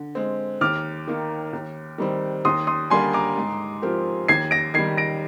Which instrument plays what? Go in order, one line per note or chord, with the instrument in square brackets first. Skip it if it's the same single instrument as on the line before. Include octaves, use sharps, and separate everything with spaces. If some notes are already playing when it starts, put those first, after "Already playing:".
Already playing: [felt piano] D3
G#3 C4
[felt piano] D#2 [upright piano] D6 F6
[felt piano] D#3 A#3
D#2
D#3 G3 C4
[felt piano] D#2 [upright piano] C6 D#6
[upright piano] C6 D#6
[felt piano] D3 G3 A#3 D4 [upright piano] G#5 C6
[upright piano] A#5 D6
[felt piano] G#2
F3 C4 G4 A#4
[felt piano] D#2 [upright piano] G#6 C7
[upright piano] A#6 D7
[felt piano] D#3 G3 [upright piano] G#6 C7
[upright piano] A#6 D7